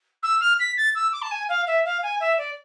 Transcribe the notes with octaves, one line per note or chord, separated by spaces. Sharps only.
E6
F6
B6
A6
E6
D6
A5
G#5
F5
E5
F5
G#5
E5
D5